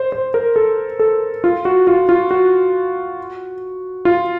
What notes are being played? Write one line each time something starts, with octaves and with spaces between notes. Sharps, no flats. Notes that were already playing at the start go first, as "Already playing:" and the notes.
Already playing: C5
C5
A#4
A4
A4
F4
F#4
F4
F4
F#4
F4